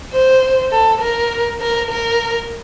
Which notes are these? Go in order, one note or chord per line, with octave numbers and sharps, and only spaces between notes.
C5
A4
A#4
A#4
A#4